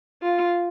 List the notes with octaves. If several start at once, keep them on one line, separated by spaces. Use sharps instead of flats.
F4